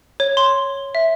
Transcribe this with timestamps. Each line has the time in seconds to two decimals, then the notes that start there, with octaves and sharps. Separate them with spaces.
0.20 C#5
0.37 C6
0.95 E5